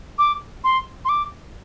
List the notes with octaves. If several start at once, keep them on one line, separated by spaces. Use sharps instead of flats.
D6
C6
C6
D6